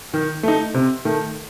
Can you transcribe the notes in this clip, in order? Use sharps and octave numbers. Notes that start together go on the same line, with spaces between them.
D#3
A3 D#4
C3
D#3 A3